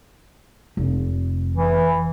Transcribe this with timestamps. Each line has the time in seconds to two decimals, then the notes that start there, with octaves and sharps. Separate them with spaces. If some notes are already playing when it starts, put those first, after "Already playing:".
0.77 F1
1.53 E3